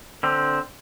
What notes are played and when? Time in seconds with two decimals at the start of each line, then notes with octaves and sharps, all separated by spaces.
0.23 D3 C4